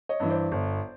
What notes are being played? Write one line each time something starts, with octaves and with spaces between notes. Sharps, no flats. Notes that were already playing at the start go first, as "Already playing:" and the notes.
C#5 D#5
G2 E3
C5 D5
G1